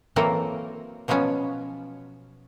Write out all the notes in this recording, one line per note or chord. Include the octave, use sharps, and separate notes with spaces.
E3 F#3 A#3 C4 A4 A#4
B2 F3 F#3 B3 C#4